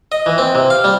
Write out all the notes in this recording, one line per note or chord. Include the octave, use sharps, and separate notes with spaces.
D#5
E3
C4
C3
F5
G3